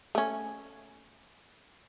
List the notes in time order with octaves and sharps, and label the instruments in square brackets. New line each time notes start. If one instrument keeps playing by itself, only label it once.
[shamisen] A3 C#4